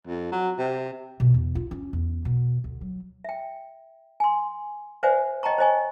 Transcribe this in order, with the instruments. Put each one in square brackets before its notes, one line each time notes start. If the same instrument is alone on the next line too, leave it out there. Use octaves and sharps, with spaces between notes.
[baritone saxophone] F2
F#3
C3
[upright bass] B2
E2
F4
C#4
E2
B2
D2
F#3
[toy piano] E5 G5
G#5 C6
B4 C5 D5 E5 F#5 G#5
C#5 D#5 G5 A5 A#5 C#6
C5 C#5 D#5 G#5 C#6